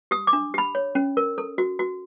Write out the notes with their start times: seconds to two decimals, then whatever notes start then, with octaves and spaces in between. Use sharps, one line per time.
0.11 G4 D#6
0.27 D6
0.33 D4
0.54 G4 B5
0.75 C#5
0.95 C#4
1.17 A#4
1.38 A4
1.58 F#4
1.79 F#4